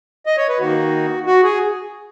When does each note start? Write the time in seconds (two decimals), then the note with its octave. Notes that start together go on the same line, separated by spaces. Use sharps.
0.26 D#5
0.37 C#5
0.49 B4
0.59 D#3 A#3 D#4 F#4
1.26 F#4
1.43 G#4